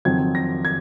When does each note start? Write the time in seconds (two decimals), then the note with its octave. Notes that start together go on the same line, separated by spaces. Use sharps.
0.05 F2 D#3 F#3 C4 G#6
0.35 A#6
0.65 G#6